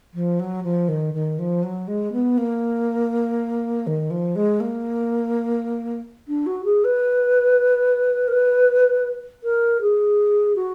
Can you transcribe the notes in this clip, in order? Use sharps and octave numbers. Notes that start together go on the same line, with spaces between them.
F3
F#3
F3
D#3
D#3
F3
F#3
G#3
B3
A#3
D#3
F3
G#3
A#3
D4
F#4
G#4
B4
A#4
B4
A#4
G#4
F#4